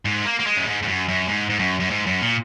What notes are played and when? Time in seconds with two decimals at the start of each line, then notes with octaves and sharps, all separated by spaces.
0.05 G#2
0.22 G#3
0.26 A#3
0.39 A#3
0.46 G#3
0.56 F#2
0.67 G#2
0.83 G#2
0.88 F#2
1.08 F#2
1.28 G#2
1.50 G#2
1.59 F#2
1.80 F#2
1.90 G#2
2.06 F#2
2.22 A#2